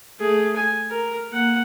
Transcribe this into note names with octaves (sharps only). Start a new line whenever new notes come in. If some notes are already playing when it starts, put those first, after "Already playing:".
A3 G#4
G#5
A#4
A#3 F#5